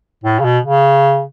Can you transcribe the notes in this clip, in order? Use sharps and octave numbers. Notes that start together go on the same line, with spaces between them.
A2
C#3
B2
C#3